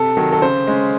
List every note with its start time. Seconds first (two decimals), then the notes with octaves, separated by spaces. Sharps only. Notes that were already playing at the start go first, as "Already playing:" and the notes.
Already playing: C3 A4
0.17 D#3 F#3
0.32 A4
0.42 C#3 C5
0.67 G#3 C#4